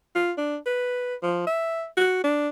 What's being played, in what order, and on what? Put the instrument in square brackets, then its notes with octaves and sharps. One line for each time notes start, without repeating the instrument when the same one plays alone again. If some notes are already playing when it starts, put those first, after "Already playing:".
[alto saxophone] F4
D4
B4
F3
E5
F#4
D4